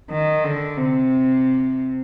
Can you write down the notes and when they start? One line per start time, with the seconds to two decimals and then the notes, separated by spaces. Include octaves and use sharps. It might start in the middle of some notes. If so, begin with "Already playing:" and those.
0.11 D#3
0.44 D3
0.78 C3